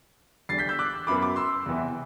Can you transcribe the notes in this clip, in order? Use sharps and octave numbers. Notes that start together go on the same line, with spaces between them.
E2 D3 G3 A6 C7
G6 B6
E6 G6
D6 F#6
F#2 F#3 B3 B5 D6
B5 D6
C6 E6
E2 C3 E3 B3